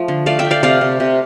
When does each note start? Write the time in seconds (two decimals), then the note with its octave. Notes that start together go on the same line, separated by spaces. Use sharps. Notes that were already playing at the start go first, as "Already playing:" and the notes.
Already playing: F3 A3
0.08 D3
0.26 A3 D5 F5
0.39 E5 G5
0.45 A3
0.51 D5 F5
0.63 C3 D5 F5
0.81 C3
1.00 C3